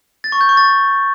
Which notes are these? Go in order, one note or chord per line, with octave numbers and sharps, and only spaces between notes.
A6
C#6
G6
C#6
A6